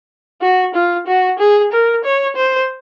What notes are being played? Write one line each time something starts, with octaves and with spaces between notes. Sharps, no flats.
F#4
F4
F#4
G#4
A#4
C#5
C5